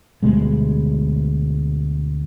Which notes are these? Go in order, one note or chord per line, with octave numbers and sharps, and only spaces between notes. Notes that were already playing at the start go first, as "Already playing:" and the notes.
D2 B2 G3 G#3